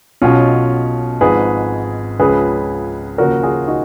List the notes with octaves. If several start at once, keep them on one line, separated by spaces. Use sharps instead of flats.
B1 B2 C#4 F4
G#1 G#2 F3 G#4 B4
C#2 C#3 F3 G#4 B4
D#2 C#3 F3 F#4 A#4
F4 G#4
D#4 F#4